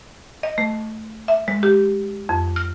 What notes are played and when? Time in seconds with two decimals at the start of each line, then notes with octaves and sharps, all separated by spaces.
0.43 D#5
0.58 A3
1.28 E5
1.48 G#3
1.63 G4
2.29 F2
2.56 F6